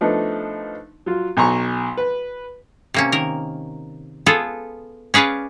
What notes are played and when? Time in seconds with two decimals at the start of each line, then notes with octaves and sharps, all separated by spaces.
0.01 F3 A3 B3 D4 D#4
1.06 F#3 F4
1.37 B1 G#5 A#5 C#6
1.97 B4
2.94 C3 A#3 C#4
3.12 D#3 A#4
4.26 B3 F4 G#4 A4
5.14 C#4 G#4 B4 D5 F5